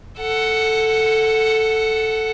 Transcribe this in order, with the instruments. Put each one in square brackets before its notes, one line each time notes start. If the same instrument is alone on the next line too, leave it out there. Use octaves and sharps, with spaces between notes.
[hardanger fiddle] A4 F#5